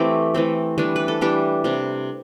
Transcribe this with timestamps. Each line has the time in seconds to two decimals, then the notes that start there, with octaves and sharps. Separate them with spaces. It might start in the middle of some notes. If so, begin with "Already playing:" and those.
Already playing: E3 A3 C4 E4 G4
0.35 E3 A3 C4
0.78 E3 G3 D4
0.96 B4
1.08 A4
1.21 E3 G3 D4 G4
1.64 C3 G3 D4